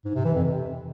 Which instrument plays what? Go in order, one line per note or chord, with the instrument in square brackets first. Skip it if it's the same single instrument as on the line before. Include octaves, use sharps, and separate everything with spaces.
[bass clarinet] G#2
C3
E3
F2
C3